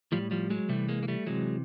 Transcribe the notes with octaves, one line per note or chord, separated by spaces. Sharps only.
A2 F3 G3
F3 G3
F#3 G#3
C3 E3 G3 A3
G#3 A#3
A#3
G3 A3
C3 E3 F#3 G#3